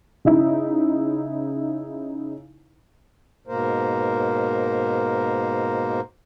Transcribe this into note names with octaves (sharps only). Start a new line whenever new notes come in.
C#3 D#4 E4
G#2 B2 A#3 A#4 C5